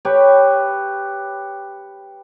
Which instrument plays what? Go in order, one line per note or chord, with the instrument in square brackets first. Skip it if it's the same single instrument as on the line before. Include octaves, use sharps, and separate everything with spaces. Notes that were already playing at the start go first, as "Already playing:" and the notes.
[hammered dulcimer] G4 B4 C#5